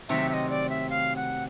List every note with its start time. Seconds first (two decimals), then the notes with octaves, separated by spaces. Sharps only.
0.09 C3 D#3 F#3 A3 C4 E5
0.29 E5
0.34 D#5
0.50 D5
0.70 E5
0.90 F5
1.16 F#5